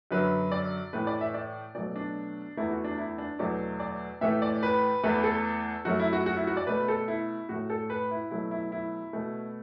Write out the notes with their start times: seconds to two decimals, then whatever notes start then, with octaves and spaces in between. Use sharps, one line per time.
0.11 F#2 D3 F#3 B4
0.52 D5
0.93 A2 E3 A3 B4
1.07 D5
1.21 E5
1.34 D5
1.75 B2 F#3 A3 D5
1.96 D4
2.57 E2 E3 A3 E4
2.71 F#4
2.84 D4
2.98 E4
3.18 D4
3.39 E2 B2 F#3 A3 D5
3.80 D5
4.21 A2 E3 A3 E5
4.42 D5
4.63 B4
5.03 E2 E3 A3 B4
5.24 A4
5.85 F#2 F#3 A3 F#4
5.99 E4
6.13 F#4
6.26 F#4
6.37 E4
6.47 F#4
6.57 D5
6.67 B2 A3 B4
6.88 A4
7.08 E4
7.49 A2 A3 F#4
7.70 A4
7.90 B4
8.11 E4
8.31 B2 F#3 A3 E4
8.51 E4
8.72 E4
9.13 B2 A3